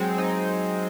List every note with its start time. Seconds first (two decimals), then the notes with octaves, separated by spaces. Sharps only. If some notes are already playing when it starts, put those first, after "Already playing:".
Already playing: F#3 G#3 C4
0.18 D#4